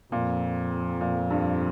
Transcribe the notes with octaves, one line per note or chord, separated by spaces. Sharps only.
F2 A#2
A#2
G2